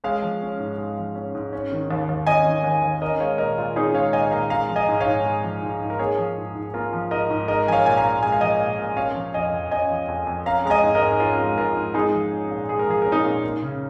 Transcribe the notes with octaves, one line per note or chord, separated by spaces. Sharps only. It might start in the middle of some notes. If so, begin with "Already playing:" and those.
G#3 C#5 F5
F3
C#4
G#2
G#3
F3
C#4
G#2
C#4
D#3
D#2
D#2
C#4 D#5 G#5
D#3
D#2
D#2
C#4 A#4 D#5
G#3 C#5 F5
A#2 A#4 D#5
A#2 F4
C#4 D#4 G#4
G#3 C#5 F5
A#2 D#5 G#5
A#2 F5 A#5
G#3 F5 A#5
F3
D#5 G#5
G#2
C#5 F5
G#2
G#3
F3
G#2
G#2
A#4
A#3 G#4 C#5
F3
G#2
G#2
A#3 F4 A#4
F3
G#2 A#4 D#5
G#2
G#3 A#4 D#5
F3 G#5
C#5 F5
A#2 G#5
F5 A#5
A#2
G#3 G#5
F5
F3 D#5 G#5
A#2
A#2
C#4 C#5 F5
F3
F2 D#5 G#5
F2
C#4 D#5 G#5
F3
F2
F2
C#4 F5 A#5
G#3 A#5
D#5 G#5
G#2
A#4 D#5
G#2
C#4 F4 A#4
G#3
G#2 F4 A#4
G#2
G#3 D#4 G#4
F3
C#4
A#2
G#3 G#4
A#4
F3 G#4
C#4 A#4
D#4 G#4
A#2
A#3
C#3